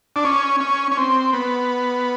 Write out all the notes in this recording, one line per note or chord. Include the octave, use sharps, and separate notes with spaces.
D4
C#4
C#4
C#4
C4
B3